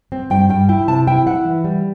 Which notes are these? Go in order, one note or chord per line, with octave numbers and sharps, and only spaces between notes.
C4
G2 G5
G2 G5
E4 G5
C3 A5
E4 G5
E4 F#5
E3
G3